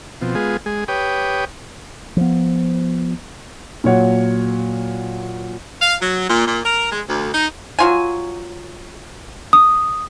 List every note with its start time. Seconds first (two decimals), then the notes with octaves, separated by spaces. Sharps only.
0.21 B2 F3 C4
0.35 G#3 B3 F4 G#4
0.66 G#3 G#4
0.88 G4 B4 C#5 G5 D#6
2.17 F3 B3
3.84 A#2 F#3 C#5 F#5
5.81 F5
6.02 F#3
6.30 A#2
6.47 A#2
6.65 A#4
6.92 G#3
7.09 D2
7.34 D#4
7.79 F#3 F4 G#5
9.53 D#6